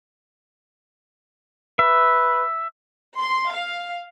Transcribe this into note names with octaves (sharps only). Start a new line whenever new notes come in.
B4 E5
C6
F5